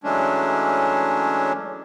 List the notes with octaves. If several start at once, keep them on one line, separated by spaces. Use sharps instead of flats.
E3 F#3 G#3 A3 C#4 D4